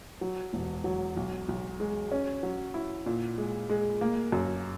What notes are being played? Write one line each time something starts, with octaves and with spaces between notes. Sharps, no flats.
F#3
E1
F#3
B1
B1
G#3
C#4
F#3
E4
A#2
G#3
G#3
A#3
F#2